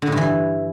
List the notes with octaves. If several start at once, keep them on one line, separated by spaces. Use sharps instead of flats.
D3
A2
G2
E3